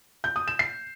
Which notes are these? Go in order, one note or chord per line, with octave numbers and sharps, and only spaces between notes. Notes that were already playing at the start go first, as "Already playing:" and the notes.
G6
D#6
E7
C7